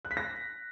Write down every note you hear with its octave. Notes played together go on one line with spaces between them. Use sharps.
F#6
B6
A#6